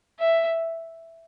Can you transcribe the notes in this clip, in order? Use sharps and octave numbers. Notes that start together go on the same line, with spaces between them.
E5